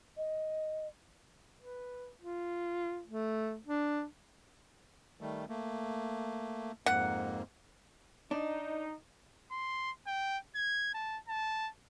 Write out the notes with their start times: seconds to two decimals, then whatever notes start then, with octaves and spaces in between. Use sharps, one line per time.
0.17 D#5
1.62 B4
2.20 F4
3.08 A3
3.67 D4
5.21 D#3 G3 A3
5.49 A3 A#3
6.86 F2 G#2 A#3 F#5
8.31 D4 D#4
9.51 C6
10.07 G5
10.55 G#6
10.94 A5
11.28 A5